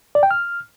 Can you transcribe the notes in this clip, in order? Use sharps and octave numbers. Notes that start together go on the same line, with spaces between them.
D5
G5
F6